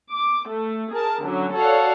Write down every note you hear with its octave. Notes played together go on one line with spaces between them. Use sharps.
D6
A3
G#4 A#4 A5
D3 F#3 C#4
F#4 A4 C#5 D5 F5 F#5